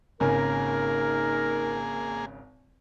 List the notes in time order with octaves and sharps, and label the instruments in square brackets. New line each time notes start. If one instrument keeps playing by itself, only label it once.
[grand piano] G#1 C#3 G#5 [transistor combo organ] A#3 G#4 [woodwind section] D#4 A#4